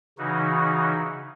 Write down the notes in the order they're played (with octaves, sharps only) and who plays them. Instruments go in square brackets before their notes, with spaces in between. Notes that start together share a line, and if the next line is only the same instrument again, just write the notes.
[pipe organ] C#3 E3 D#4 F#4